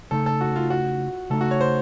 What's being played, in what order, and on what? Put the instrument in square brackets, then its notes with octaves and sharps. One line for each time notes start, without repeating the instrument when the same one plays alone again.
[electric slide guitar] C#3 A3 D#4 [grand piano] A4
[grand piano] A4
F#4
F4
F#4
[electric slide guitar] C#3 A3 D#4 [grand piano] A4
[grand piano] F#4
C#5
C5